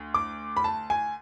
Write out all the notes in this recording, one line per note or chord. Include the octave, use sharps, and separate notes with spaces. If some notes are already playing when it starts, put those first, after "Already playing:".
Already playing: D2
D6
B5
A5
G#5